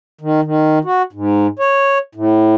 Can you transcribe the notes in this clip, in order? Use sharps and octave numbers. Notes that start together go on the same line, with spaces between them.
D#3
D#3
F#4
G#2
C#5
A2